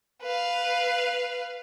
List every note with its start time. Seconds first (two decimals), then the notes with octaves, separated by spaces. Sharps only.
0.22 B4 F5